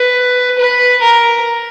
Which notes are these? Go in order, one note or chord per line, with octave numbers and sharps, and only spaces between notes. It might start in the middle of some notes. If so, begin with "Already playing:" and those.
Already playing: B4
B4
A#4